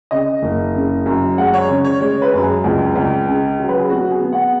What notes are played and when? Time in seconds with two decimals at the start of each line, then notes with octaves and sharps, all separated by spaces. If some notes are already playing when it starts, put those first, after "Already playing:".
0.11 C#3 D#5
0.42 F#1
0.75 C#3
1.06 F#2
1.37 G#3 F#5
1.54 C#5
1.69 C#3
1.85 C#5
2.00 G#3 C#5
2.22 B4
2.33 F#2
2.43 G#4
2.64 C#2 G#4
2.95 C#2
3.27 C#3 G#4
3.59 F#3
3.69 B4
3.79 G#4
3.90 B3 F#4
4.11 G#4
4.22 B3
4.33 F#5